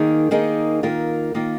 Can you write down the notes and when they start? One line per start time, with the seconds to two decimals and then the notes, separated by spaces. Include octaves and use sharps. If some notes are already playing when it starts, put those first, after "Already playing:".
Already playing: D#3 A#3 D#4 G#4
0.31 D#3 A#3 D#4 G#4
0.83 D#3 A#3 F4 A#4
1.35 D#3 A#3 F4 A#4